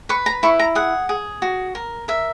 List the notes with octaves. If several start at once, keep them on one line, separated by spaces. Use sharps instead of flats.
B4 C#6
A#5
E4 C#6
A#5
G#4 F#5
G#4
F#4
A#4
A#4 E5